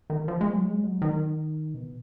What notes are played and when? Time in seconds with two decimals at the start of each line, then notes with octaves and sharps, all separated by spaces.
0.10 D#3
0.28 F3
0.41 G#3
0.53 F#3
0.65 G#3
0.83 F#3
1.02 D#3
1.74 B2